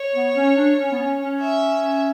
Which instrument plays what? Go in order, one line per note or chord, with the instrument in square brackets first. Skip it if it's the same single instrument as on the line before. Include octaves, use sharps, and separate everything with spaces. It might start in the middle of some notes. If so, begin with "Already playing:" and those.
Already playing: [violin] C#5
[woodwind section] B3
C#4
D4
C#4
B3
C#4
C#4
[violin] E5